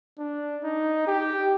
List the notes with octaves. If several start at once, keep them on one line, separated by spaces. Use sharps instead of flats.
D4
D#4
G4